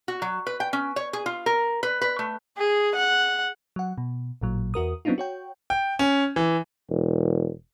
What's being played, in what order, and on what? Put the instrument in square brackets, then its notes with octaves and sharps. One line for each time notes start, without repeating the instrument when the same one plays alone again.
[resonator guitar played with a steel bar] F#4
F#3
B4
G5
C#4
C#5
G#4
F4
A#4
B4
B4
A3
[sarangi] G#4
F#5
[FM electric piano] F#3 F#5
B2
A1 A#2 F#3
E2 F#4 A#4 D#6
F#3 B3 C4 D4 D#4 F4
F#4 C#5 G5
[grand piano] G5
C#4
E3
[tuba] E1